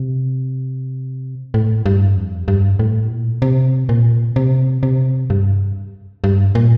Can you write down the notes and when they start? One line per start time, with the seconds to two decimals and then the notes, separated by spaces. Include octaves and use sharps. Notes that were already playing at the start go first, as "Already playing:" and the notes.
Already playing: C3
1.54 A2
1.86 G2
2.16 F2
2.48 G2
2.79 A2
3.11 A#2
3.42 C3
3.89 A#2
4.36 C3
4.83 C3
5.30 G2
6.24 G2
6.55 A#2